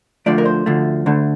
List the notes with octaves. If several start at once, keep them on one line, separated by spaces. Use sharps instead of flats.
D2 D3 F3 A3 D5
A#4
C5
D2 D3 F3 A3
D2 D3 A3